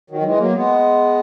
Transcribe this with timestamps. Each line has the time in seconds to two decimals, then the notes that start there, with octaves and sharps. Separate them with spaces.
0.10 D#3 F#3
0.21 F#3
0.25 E3 G#3
0.40 F#3 A#3
0.55 G#3 B3